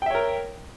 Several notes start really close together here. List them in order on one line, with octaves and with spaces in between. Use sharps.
G5 E5 C#5 A#4